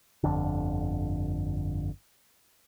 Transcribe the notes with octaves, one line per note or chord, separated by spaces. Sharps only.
G1 F2 D3